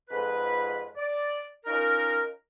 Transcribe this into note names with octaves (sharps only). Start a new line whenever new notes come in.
F2 G#2 B4
D5
C#4 D#4 F4 A#4